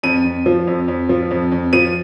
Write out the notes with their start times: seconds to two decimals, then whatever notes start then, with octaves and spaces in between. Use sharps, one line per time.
0.03 F2 D#7
0.24 F2
0.46 F3
0.67 F2
0.88 F2
1.09 F3
1.31 F2
1.52 F2
1.73 F3 D#7